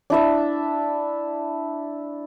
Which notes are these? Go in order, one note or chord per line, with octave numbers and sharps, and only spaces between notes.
D4 E4 E5